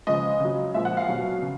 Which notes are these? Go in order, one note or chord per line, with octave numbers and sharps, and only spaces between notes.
C#3 F3 G#3 D#5
C#3 F#3
A#2 F3 G#3 E5
F#5
F5
B2 F#3
C#3